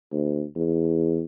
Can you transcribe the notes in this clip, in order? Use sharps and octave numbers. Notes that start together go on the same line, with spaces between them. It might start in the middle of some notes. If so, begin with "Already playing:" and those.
D2
E2